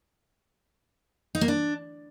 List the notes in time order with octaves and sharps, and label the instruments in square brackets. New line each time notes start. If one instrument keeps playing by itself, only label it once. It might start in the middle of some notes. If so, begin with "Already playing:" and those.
[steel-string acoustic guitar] D#4
A#3
D4